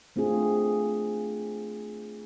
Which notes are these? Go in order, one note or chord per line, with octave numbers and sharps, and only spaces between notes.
A3 C4 D4 F4 G#4